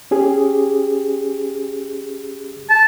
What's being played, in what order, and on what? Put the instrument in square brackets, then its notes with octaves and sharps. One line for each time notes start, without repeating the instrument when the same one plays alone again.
[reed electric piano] C#4 G4 G#4
[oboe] A5